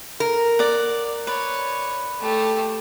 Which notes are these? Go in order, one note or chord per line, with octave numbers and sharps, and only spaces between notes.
A#4
D5 F#5
B4 C#5 D5
A3 G4